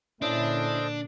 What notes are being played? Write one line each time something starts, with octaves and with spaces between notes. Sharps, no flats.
A#2 D3 C#4 D4 E4 A4 C5 D#5